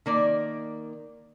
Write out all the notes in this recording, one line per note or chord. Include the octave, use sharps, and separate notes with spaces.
D#3 A#3 D5